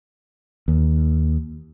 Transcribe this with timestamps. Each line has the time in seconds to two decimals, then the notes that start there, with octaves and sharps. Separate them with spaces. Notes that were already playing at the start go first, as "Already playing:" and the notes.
0.68 D#2